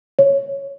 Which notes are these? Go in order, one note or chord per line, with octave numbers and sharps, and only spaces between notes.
C#5